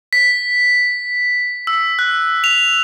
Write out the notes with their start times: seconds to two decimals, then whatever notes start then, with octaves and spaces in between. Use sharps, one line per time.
0.13 B6
1.67 E6
1.99 F#6
2.44 F7